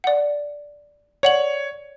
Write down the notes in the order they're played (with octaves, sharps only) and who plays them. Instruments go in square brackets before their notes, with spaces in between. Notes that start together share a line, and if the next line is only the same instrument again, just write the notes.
[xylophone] D5 F#5
[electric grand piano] C#5 [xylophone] D5 F#5 F#7